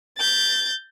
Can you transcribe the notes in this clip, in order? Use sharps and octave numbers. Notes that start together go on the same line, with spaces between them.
G6 A6